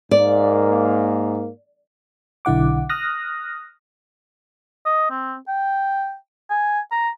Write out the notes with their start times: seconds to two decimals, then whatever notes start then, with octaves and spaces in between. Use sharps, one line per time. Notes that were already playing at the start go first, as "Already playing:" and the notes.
0.11 G#2 A#3 D5
2.45 B1 D3 E4 F#5 D6
2.89 D#6 F6 F#6 A#6
4.86 D#5
5.11 C4
5.48 G5
6.50 G#5
6.92 A#5